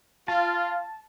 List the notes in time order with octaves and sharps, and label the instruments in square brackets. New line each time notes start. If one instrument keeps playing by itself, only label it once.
[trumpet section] F4 [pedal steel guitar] A5